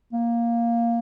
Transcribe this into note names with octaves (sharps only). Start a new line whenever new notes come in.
A#3